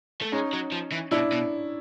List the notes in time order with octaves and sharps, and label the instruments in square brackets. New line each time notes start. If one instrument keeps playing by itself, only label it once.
[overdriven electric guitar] A3
[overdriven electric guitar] G#3 [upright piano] C#4 D#4
[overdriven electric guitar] F#3
F3
E3
[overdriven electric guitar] B2 [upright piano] D4 E4
[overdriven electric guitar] B2